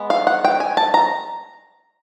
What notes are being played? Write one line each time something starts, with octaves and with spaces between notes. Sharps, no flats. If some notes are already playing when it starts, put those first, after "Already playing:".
Already playing: G#3 B3
F5
F#5
G5
G#5
A5
A#5